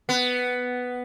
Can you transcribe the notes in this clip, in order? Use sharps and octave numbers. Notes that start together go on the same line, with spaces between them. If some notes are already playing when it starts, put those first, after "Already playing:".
B3